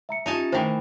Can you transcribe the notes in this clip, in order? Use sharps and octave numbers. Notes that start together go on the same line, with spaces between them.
E5 A#5 C#7
C#4 D#4 F4 G4 G#5 A5
D#3 E3 A3 C5 E5 G5